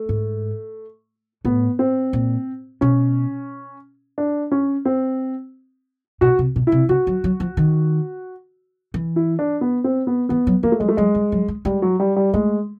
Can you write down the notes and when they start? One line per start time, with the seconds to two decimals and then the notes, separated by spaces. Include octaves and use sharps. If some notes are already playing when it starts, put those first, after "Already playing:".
Already playing: A3
0.09 G#2
1.45 A2 B3
1.79 C4
2.13 A#2
2.81 B2 C#4
4.18 D4
4.51 C#4
4.85 C4
6.21 B2 F#4
6.39 C3
6.56 B2
6.67 E4
6.72 C3
6.89 C#3 F#4
7.07 F#3
7.24 F#3
7.40 F3
7.57 D#3
8.94 E3
9.16 E4
9.39 D4
9.61 B3
9.84 C4
10.07 B3
10.29 E3 B3
10.47 F#3
10.63 F3 A#3
10.72 A3
10.80 F#3 G#3
10.88 A3
10.97 F#3 G#3
11.15 G3
11.32 F#3
11.48 G#3
11.65 G3 G#3
11.82 F#3
12.00 G3
12.16 G3
12.33 G#3 A3